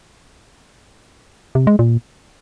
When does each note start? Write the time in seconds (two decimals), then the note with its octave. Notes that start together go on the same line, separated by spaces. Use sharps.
1.55 C3
1.67 G#3
1.79 A#2